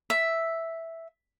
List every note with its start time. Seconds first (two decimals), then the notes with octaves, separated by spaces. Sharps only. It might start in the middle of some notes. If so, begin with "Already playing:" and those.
0.10 E5